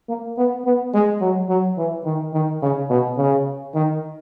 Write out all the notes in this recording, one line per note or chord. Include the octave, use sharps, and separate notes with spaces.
A#3
B3
B3
G#3
F#3
F#3
E3
D#3
D#3
C#3
B2
C#3
D#3